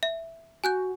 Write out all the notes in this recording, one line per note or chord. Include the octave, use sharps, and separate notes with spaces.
E5
F#4 G#5 F#6 G6